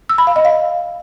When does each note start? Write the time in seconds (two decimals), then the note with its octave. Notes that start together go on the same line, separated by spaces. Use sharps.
0.09 E6
0.18 B5
0.27 F5
0.36 D#5
0.45 F5